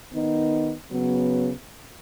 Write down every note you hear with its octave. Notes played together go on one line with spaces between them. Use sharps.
D#3 B3 D#4
C#3 F#3 B3